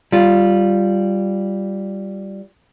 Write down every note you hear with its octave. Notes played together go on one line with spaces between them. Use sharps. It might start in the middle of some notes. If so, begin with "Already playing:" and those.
G3 F4